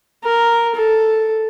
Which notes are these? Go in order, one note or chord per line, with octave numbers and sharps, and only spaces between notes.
A#4
A4